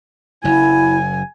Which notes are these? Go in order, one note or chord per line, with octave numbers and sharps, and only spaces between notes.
F#1 F#2 E4 G#5